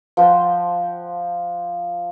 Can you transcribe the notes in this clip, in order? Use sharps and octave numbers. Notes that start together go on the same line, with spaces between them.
F3 C5 F#5 G5